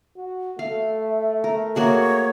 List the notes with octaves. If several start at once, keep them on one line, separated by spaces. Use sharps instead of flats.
F#4
A3 E5 F5
A#4
A#3 F#4 G#4 C#5